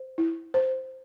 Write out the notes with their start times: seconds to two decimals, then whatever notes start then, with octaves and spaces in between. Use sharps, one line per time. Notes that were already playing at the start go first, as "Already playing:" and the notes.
Already playing: C5
0.18 E4
0.54 C5